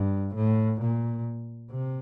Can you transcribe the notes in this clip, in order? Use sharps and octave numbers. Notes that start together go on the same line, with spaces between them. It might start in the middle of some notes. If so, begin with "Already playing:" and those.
Already playing: G2
A2
A#2
C3